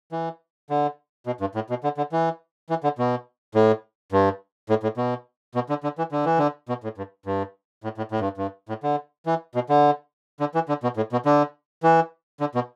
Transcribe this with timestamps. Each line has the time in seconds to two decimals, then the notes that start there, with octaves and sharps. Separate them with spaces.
0.12 E3
0.70 D3
1.27 B2
1.41 G2
1.55 A2
1.70 B2
1.84 D3
1.97 D3
2.12 E3
2.70 E3
2.84 D3
2.98 B2
3.55 A2
4.12 G2
4.70 A2
4.83 A2
4.97 B2
5.55 B2
5.69 D3
5.83 D3
5.98 E3
6.12 D3
6.25 E3
6.38 D3
6.69 B2
6.84 A2
6.98 G2
7.26 G2
7.84 A2
7.97 A2
8.11 A2
8.20 G2
8.37 G2
8.69 A2
8.83 D3
9.26 E3
9.55 B2
9.69 D3
10.40 D3
10.55 E3
10.69 D3
10.83 B2
10.97 A2
11.12 B2
11.25 D3
11.83 E3
12.40 D3
12.55 B2